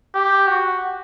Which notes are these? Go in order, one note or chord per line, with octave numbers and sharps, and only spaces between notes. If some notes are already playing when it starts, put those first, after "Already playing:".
G4
F#4